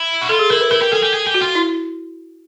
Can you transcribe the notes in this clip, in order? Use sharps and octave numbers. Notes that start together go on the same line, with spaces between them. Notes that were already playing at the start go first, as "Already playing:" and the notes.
Already playing: E4
F#4
F4 A4
G#4
E4 A#4
B4
E4 A#4
G4
G#4 A4
G4
G#4
G4
F#4
F4
E4